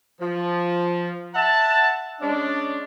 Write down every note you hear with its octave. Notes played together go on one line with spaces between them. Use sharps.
F3
E5 F#5 A5
G#3 C#4 D4